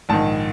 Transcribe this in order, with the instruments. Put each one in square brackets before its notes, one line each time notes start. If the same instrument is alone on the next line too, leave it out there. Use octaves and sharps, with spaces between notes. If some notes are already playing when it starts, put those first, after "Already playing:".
[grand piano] A#1 G#2 D#3 A5